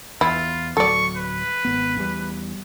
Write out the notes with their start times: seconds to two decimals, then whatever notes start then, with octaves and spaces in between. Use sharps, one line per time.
0.21 E2 E4 F4
0.77 D1 F#3 A4 D5 C#6
1.16 B4
1.65 G#1 B3
1.97 E2 G3